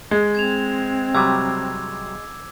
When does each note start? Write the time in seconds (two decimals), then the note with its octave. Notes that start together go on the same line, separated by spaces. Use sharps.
0.11 G#3
0.35 C4 G#6 E7 F7
1.15 C3 F#3 G3 D6 E6 G#6